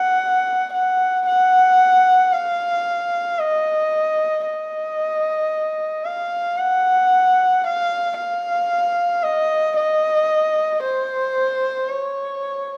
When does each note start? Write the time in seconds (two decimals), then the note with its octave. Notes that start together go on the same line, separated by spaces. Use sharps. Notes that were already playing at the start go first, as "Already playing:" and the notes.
Already playing: F#5
0.73 F#5
1.27 F#5
2.33 F5
3.39 D#5
4.46 D#5
6.05 F5
6.58 F#5
7.64 F5
8.17 F5
9.23 D#5
9.77 D#5
10.83 C5
11.90 C#5